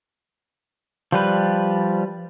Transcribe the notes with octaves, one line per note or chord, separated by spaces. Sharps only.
F3 G3 B4